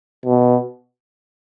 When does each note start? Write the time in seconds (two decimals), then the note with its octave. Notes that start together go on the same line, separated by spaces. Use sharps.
0.26 B2